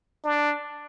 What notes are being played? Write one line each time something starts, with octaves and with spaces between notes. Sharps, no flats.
D4